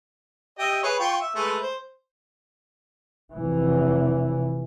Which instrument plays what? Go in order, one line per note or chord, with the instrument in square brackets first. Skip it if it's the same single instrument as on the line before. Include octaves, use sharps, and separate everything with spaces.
[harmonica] G4 D#5 E5
G#4 B4 C#5
F4 G5 C#6
E5
G#3 A3 B4
C5
[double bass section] F1 E3